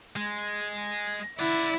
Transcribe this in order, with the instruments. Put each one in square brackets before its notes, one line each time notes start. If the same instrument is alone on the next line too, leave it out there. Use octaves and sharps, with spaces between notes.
[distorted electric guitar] G#3
[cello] E4 [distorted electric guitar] D5 F#5